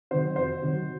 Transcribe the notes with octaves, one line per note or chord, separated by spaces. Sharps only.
C3 D#3 F#3 C5
F2 C5
C3 D#3 F#3